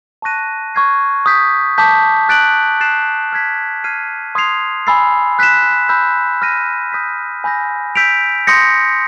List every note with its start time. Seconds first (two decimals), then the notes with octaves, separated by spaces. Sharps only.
0.22 A5 C#6 F#6 A#6 D#7
0.75 C#6 F6 G#6 C7
1.26 D#6 G6 B6
1.78 A5 D6 G6 B6
2.29 F#6 A6 D7 F#7
2.81 F#6 A6 C7 E7
3.32 F6 G#6 B6
3.84 F6 G#6 C7 D#7
4.35 C6 D#6 G#6 C7 F7
4.87 G#5 B5 E6 A6 C7
5.39 F#6 B6 E7
5.89 B5 E6 G6
6.42 F6 A#6 D#7
6.92 D#6 G6 B6
7.44 G#5 B5 E6 G6 A#6
7.95 E6 G6 B6 D7 F7
8.47 C6 D#6 G6 A#6 C#7